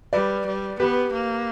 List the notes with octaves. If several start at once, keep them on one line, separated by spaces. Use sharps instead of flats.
G3 B4 D5
G3
B3 G4 B4
A#3